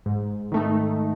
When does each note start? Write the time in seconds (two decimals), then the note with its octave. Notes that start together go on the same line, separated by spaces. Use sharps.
0.06 G#2
0.52 D#3 A3 D#4